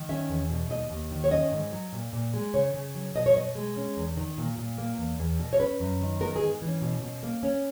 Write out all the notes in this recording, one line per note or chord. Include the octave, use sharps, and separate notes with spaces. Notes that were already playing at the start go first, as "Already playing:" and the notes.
Already playing: D#3
C#4 E5
E2
B2
D#2 D#5
D#2
D#3
C#5
C#4 D#5
G#2
F#3
A#2
A#2
G#3
C#3 C#5
C#3
F#3
B2 D#5
C#5
B2 D#5
G#3
C#4
E2
D#3
A#2
A#2
A#3
E2
E2
B2
C#5
C#4 B4
F#2
D#3
B3 A#4
G#4
G#2
E3
C#4
B2
B2
A#3
C#4